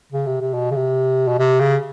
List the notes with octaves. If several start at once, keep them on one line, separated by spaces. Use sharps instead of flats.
C#3
C3
C3
B2
C#3
C3
B2
C3
C#3